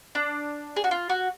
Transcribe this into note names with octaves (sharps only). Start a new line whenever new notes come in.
D4
G#4
F#4
F4
F#4